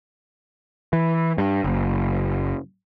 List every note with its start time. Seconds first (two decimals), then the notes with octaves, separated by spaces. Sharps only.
0.93 E3
1.38 G2
1.64 F#1